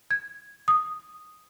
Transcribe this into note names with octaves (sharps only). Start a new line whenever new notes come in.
G#6
D#6